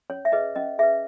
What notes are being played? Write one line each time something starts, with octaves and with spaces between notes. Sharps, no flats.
C#4 C#5
E5
G#4 B4 D#5
C#4 D#5
G#4 B4 E5